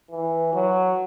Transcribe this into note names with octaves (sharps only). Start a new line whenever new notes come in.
E3
F#3